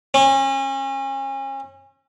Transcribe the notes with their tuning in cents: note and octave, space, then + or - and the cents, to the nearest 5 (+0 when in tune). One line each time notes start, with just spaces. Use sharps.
C#4 -35